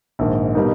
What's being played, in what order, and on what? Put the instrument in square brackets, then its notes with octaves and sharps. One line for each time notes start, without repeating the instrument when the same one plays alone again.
[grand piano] A#1 G#2 D#3
B2 G3 A#3 D#4